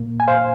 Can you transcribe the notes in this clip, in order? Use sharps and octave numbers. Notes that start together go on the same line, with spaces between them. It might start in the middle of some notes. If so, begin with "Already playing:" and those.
Already playing: A#2 A#3
G#5
C5 F5